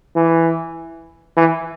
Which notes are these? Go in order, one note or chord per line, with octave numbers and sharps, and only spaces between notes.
E3
E3